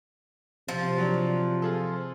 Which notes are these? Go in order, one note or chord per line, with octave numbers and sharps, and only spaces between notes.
C3 F3
F#3 D4
F4 G#4 A4